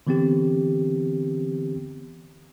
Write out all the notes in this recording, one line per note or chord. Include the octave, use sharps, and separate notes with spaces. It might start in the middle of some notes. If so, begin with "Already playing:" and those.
D3 E3 B3 C4 G4